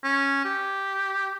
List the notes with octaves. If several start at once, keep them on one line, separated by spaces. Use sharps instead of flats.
C#4
G4